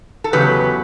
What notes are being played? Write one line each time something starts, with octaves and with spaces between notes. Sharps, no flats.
A4
E2 C#3 F#3 G4 B4